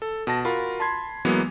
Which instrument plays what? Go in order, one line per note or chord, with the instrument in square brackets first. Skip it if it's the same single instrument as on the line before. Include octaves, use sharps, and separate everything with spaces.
[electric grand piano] A4
B2 A5 A#6
F4 F#4 A#4 B5
A5 B5 C6 G#6
E3 F#3 G#3 A#3 B3